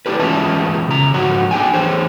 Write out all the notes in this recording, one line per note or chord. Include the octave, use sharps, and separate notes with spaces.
D4 E4 G4 B4
E2 G#3 C#4 F4 E5 A5
C#3 A#5
G#2 F3 F#4 F#5
D4 G#4 G5 G#5
E2 G#4 C5 C#5